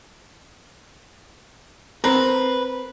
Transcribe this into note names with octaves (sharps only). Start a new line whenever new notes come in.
C4 A#4 B4